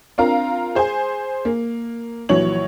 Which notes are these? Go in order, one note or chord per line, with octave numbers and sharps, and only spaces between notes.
C4 D4 F4 A#4 F5 A#5
G#4 C5 G#5
A#3
A#1 E3 F#3 C#5 F#7